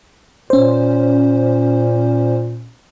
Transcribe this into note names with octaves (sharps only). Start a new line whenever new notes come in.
A#2 C#4 C5